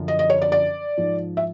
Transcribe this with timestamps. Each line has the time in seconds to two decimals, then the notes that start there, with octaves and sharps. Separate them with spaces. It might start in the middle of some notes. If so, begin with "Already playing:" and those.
Already playing: F#2 D3 F3
0.08 D#5
0.19 D#5
0.30 C#5
0.42 D5
0.52 D5
0.98 G#2 F3
1.37 E5